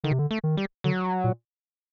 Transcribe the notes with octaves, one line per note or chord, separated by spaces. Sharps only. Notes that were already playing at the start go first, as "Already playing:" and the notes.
D3 D#3
C3
D3
A3
D#3
G3
D3 F#3
A#2